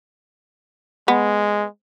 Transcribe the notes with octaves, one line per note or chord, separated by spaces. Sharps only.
G#3 B3